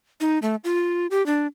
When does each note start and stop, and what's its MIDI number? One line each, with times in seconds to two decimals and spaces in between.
0.21 0.39 63
0.42 0.56 57
0.64 1.07 65
1.11 1.25 67
1.26 1.47 62